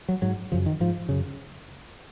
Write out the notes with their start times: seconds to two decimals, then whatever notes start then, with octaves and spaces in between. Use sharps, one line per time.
0.09 F#3
0.22 G#2 F#3
0.51 F#2 C#3 F3
0.66 D#3
0.80 G#2 F3
1.09 F#2 C#3